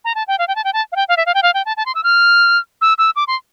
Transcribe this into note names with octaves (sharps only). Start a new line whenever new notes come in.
A#5
A5
G5
F5
G5
A5
G5
A5
F5
G5
F5
E5
F5
G5
F5
G5
A5
A5
C6
E6
F6
E6
E6
D6
C6